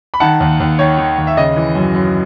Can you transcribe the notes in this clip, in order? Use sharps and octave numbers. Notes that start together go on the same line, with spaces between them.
B5
D#3 F#5 A5
D#2
D#2
D#3 C#5
D#3
D#2
E5
C#3 D#5
E3
F#2
F#2